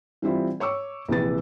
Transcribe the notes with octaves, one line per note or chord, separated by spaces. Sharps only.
E3 G3 C4 E4 F4
C#5 C#6 D6 E6
A#1 C3 E3 B4 A6